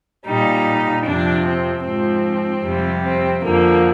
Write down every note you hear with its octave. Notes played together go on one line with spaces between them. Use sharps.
A#2 G3 D#4
F2 C3 F3 D4
C4
G#2 F3 C4
F2 C3 G3
C4
F2 D3 F3 A#3